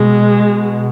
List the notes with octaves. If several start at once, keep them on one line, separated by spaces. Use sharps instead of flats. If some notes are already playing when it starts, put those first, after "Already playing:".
Already playing: B2 G#3